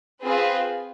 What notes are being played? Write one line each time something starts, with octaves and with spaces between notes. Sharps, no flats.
C4 F4 G#4 B4